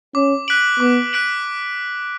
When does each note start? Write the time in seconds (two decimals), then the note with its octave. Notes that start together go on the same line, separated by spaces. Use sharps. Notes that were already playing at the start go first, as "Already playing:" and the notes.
0.15 C#4 D6
0.48 F#6 B6 D7 F#7
0.80 B3 D6
1.13 F#6 B6 D7 F#7